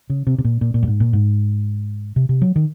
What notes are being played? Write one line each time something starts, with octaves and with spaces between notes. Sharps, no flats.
C#3
C3
C3
A#2
A#2
A#2
F#2
G#2
A#2
G#2
C3
C3
F#3
D#3